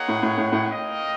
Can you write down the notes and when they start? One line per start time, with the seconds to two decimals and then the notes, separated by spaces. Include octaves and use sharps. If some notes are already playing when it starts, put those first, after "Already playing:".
Already playing: A#3 D#4 G#4 C#5 F#5
0.08 A2
0.23 A2
0.38 A2
0.52 A2
0.67 F4 A#4 D#5 G5